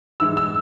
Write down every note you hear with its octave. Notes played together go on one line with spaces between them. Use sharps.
G#2 E3 G#3 E6
E6